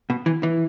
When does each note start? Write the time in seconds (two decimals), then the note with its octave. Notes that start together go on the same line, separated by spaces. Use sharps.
0.10 B2
0.26 E3
0.43 E3